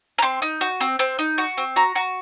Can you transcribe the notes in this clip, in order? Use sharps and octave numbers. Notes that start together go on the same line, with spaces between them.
A#5
C4 C6
D#4
F#4
C4
C4
D#4
F#4
C4
F#4 A#5
F#4